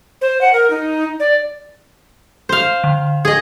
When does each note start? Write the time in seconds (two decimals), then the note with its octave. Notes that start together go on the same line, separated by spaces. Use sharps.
0.21 C5
0.41 F#5
0.53 A#4
0.70 D#4
1.20 D5
2.49 C5 F5
2.84 D3
3.25 G#4 D#5